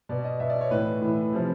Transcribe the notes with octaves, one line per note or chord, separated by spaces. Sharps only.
B2 D5
D#5
B2 E5
D5
C#5
A2 E3 B4
A2 E3
C3 F3